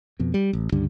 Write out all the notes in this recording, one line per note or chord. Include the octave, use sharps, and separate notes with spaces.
F2 B2
G3
A1
C#2 G2 D3 G3